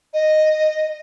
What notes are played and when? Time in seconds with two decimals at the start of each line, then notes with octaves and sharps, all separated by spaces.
0.14 D#5